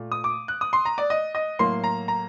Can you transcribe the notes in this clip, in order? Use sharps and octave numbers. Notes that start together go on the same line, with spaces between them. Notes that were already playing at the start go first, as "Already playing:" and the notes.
Already playing: A#2 A3
D#6
D6
F#6
D#6
C6
A#5
D5
D#5
D#5
A2 F#3 A#3 C6
A#5
A#5